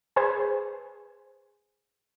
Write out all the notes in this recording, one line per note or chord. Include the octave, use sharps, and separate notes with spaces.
G#4 B4 C5 G#5